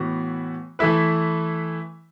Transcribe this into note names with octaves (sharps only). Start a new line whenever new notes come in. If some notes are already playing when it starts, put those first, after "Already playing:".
Already playing: A2 E3 B3 F#4
E3 A3 E4 B4